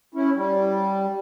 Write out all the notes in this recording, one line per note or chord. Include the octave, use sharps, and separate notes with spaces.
C#4 E4
G3